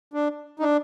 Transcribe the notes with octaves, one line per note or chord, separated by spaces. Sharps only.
D4
D#4
D4